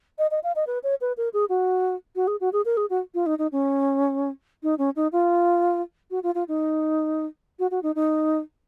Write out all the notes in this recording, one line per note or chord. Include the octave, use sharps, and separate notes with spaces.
D#5
D#5
F5
D#5
B4
C#5
B4
A#4
G#4
F#4
F#4
G#4
F#4
G#4
A#4
G#4
F#4
F4
D#4
D#4
C#4
D#4
C#4
D#4
F4
F#4
F4
F4
D#4
F#4
F#4
D#4
D#4